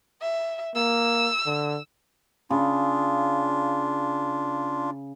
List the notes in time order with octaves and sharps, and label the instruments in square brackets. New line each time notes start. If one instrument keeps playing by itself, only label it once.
[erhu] E5
[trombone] A#3 [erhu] E6
[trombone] D3
[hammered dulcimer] C#3 [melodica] D4 F4